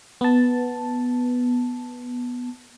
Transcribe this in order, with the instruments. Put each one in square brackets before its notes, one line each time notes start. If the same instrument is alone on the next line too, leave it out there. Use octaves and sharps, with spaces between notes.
[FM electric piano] B3 A5